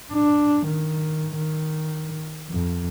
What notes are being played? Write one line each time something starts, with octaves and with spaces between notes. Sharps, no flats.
D4
D#3
D#3
F2